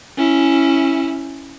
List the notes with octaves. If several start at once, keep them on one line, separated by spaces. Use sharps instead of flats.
C#4 E4